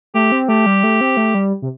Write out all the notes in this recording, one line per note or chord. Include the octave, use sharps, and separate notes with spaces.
A3 G4
C4
A3 G4
G3
A3
C4
A3
G3
C3